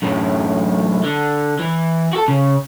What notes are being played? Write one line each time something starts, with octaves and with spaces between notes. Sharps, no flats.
F#2 A2
D3
E3
F#4 A4
C#3